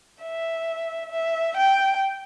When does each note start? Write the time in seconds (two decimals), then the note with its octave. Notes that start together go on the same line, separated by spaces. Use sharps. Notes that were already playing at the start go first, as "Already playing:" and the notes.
0.23 E5
1.11 E5
1.57 G5